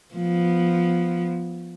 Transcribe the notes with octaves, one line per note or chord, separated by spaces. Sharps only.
F3 B3